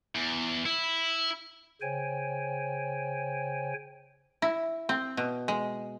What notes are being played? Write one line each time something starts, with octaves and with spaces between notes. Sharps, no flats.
E2
E4
C#3 C5 C#5 G5 G#5
E4
C4
B2
G#3